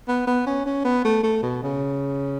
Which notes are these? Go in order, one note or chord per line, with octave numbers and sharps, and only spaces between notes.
B3
B3
C#4
C#4
B3
A3
A3
B2
C#3